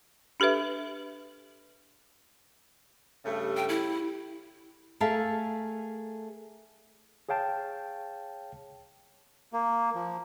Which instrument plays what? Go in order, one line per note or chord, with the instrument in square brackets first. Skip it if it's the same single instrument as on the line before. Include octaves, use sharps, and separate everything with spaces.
[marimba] D4 G4 A4 B4 E5
[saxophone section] G2 C#3 A3
[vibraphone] G4
[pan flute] G5
E4
[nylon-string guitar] A3 G#4 A#4 E5 F5 A5
[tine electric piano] G#4 C#5 F5 G5 A5
[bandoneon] A#3
F3